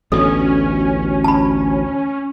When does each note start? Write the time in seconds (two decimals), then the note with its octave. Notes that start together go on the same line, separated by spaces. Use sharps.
0.12 A1 D2 B2 C#4 A4
1.24 A5 B5